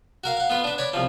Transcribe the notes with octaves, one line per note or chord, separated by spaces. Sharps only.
F#4 A#4 F5
F5 F#5
B3 F4 B4
D4 B4
C#5 D5 B5
C2 F3